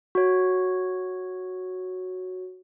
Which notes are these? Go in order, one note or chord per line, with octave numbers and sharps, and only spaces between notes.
F#4 C#5